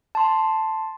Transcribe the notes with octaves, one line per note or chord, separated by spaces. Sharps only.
A5 C6